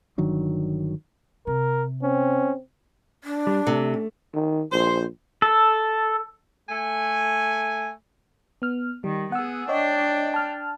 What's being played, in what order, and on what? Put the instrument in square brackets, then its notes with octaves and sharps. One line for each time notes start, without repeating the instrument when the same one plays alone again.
[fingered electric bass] G1 D#3 F#3 D4
[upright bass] C3 [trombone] A#4
[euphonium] C4 [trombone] C#4
[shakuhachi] D4
[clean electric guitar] G3
[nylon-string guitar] C3 [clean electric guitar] A3
[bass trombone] D#3
[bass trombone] A#1 [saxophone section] C5
[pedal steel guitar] A4
[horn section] A3 G#5
[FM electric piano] B3 F6
[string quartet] D#3 [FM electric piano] G3
[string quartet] B3 G#4 [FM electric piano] F#5 E6
[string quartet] D4 G5 [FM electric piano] C#5 D#5
[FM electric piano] A5 F6